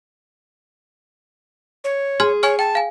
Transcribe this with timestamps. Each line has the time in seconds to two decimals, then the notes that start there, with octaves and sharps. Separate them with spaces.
1.84 C#5
2.20 G#4 C6 F6 G#6
2.43 C#5 G#5 C#6 F6
2.59 G5 A5
2.75 F5 G#5